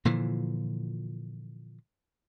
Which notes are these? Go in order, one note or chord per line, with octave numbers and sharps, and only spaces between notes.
A#2 D3 E3 F3